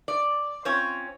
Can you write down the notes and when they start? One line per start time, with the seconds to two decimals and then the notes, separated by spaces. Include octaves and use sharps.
0.08 D5
0.65 C4 C#4 F4 C#5